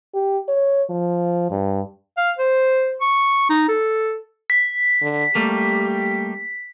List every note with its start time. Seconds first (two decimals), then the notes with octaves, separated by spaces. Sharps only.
0.14 G4
0.48 C#5
0.90 F3
1.50 G2
2.17 F5
2.39 C5
3.01 C#6
3.50 D#4
3.69 A4
4.50 B6
5.02 D3
5.35 G3 A3 A#3 G4